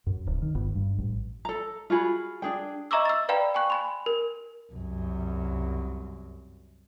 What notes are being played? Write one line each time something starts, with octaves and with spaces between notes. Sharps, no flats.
F#2
D1
D#3
G1
G2
A1
A4 A#5
F4 F#4 G#4 B5
D4 G#4 G5
D#5 E5 A#5 C#6 D6 E6
E6 A6
B4 D5 F5 G5 A#5 B5
G5 G#5 C#6 F#6
G#5 B5 C6
A#4
C2 F#2